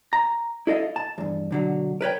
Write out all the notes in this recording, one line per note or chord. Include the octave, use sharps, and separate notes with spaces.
A#5
E4 A4 D#5 F5
A5
E2 G2
B1 D3 F#3
A#4 B4 C#5 G5